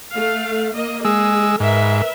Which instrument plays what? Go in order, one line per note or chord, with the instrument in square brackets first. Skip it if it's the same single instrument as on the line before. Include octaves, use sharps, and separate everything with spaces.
[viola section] A3 F5
A#3 D#5
[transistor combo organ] G#3 E6 [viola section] G#4
[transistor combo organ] G#2 [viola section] A#4 B4 E5